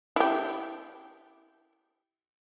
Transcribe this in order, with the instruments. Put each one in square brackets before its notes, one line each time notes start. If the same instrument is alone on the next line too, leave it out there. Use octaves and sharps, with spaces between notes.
[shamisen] E4 G4